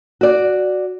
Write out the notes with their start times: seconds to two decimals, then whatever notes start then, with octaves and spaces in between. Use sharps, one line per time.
0.21 F#4 D5